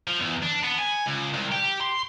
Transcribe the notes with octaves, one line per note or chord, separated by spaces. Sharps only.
F3
E2
D4
B3
G#5
C#2
C2
G4
C6